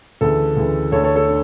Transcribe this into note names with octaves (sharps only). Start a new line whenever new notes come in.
D2 C#3 E3 A4
D2 C#3 E3
D2 D3 A3 A4 C#5
A4 C#5
A4
D3